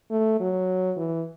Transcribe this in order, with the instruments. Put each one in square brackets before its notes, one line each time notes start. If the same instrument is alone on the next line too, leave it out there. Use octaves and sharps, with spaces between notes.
[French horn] A3
F#3
E3